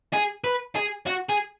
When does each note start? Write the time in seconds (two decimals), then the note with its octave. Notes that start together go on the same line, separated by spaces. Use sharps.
0.14 G#4
0.44 B4
0.76 G#4
1.06 F#4
1.29 G#4